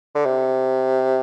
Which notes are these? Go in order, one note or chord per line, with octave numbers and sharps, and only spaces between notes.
D3
C3